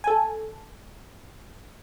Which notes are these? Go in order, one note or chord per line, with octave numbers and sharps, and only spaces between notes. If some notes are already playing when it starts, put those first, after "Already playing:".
A4 G#5